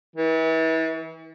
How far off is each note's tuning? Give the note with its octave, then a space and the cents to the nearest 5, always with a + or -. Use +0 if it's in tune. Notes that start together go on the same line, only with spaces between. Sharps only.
E3 -35